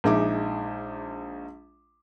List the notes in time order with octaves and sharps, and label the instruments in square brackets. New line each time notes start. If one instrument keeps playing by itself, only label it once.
[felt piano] A#1 G#3 D#4 E5 D6